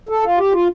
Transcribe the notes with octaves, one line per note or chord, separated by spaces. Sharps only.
A4
F4
G4
F4